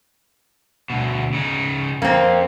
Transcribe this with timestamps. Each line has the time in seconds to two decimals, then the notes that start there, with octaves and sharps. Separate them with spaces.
0.90 D2 B2
1.33 C#3 D#4
2.02 F2 A#3 C4